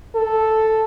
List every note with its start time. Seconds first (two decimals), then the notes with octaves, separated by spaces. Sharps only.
0.15 A4